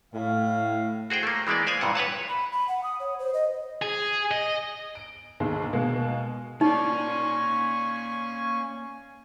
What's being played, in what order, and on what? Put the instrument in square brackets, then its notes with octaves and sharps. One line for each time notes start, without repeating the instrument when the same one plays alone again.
[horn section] A2 [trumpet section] F5
[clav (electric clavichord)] F#4 G#4 C5 G5
A3 A#3
E3 G#3 A#3 B3 D5
C5 D5 F5 G#5
G2 A#2 E3 F#5
B4 C#5 F#5 A5
[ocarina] B5
B5
F#5
D#6
C#5
C5
D#5
[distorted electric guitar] G#4
D#5
[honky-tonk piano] D7
D#2 G#2 D3 D#3 G#3
B2 G#3 A#3
[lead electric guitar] A#3 D5 [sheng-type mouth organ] C#4 G#5 C#6 [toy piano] D#4